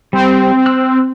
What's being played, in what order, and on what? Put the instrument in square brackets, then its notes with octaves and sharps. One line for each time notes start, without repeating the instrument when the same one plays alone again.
[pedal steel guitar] G3 [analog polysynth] C4
[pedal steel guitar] E6 F#6